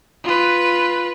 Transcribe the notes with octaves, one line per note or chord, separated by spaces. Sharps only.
F4 B4